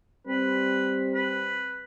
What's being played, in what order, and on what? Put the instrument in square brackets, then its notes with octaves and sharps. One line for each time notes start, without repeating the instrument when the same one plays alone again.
[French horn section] G3 C4 [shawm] B4
[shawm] B4